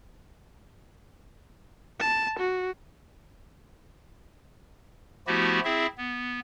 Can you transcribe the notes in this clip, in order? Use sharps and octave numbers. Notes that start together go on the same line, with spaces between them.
A5
F#4
F3 A3 B3 E4 F#4 G4
C4 E4 G#4 E5
B3